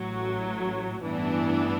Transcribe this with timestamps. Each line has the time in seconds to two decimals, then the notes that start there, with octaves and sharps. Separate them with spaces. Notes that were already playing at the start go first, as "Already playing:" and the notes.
Already playing: A1 A2 F#3
1.02 A1 G2 E3 B3 D4